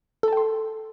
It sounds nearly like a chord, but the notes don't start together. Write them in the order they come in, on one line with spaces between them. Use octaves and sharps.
A4 A5 G5 C6